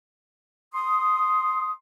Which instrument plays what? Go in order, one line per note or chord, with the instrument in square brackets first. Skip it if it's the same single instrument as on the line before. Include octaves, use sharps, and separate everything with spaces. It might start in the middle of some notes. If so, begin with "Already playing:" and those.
[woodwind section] C6 D#6